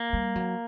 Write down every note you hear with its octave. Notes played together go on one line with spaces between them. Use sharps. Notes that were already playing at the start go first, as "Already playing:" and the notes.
Already playing: A#3
G3
F#3